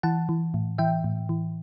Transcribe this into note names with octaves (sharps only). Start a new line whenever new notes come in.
E3 F#5 A5
E3
A2
E3 E5 G5
A2
E3